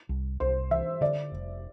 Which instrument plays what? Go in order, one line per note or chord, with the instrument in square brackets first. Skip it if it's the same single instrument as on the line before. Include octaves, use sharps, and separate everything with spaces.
[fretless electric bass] C2
[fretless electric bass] C2 [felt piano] C5
[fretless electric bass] E3 [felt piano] E5
[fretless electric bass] D3 [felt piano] D5
[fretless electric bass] F1